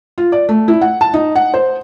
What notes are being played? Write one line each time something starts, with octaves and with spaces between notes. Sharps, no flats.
F4
D5
A3
E4
F#5
A5
D#4
F#5
C5